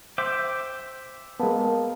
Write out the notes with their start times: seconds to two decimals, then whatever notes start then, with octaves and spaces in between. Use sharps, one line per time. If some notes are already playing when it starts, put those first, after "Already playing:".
0.18 C5 E5 G5 D6
1.40 G#3 A#3 B3 A#4 A5